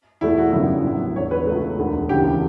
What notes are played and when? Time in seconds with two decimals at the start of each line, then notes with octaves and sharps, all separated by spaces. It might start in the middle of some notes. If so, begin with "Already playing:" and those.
0.21 E2 B2 A3 E4
0.38 F#4
0.52 G1 F#2 C#3 G3 B3 E4
0.84 A1 A2 F#3 B3
1.15 E1 E2 D3 C#5
1.31 B4
1.47 C#2 B2 A3
1.78 E1 D2 D3 A3
2.09 E1 D2 C#3 E3 G4